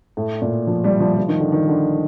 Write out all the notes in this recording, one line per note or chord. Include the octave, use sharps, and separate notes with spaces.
A2
A#2
F3
G3
F3
F3
D#3
D3
D#3
D3